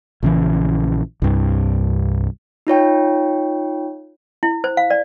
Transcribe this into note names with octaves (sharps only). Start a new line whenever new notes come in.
A#1 C#3 E3
C2 G2
D#4 F4 C#5 G5
E4
C5
F5
D5